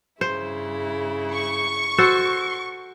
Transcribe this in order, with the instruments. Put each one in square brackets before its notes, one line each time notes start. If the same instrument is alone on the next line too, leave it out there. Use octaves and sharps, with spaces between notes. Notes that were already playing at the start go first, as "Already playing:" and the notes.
[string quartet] G2 C#3 E4 [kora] C5
[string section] C#6
[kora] F#4 A4 C5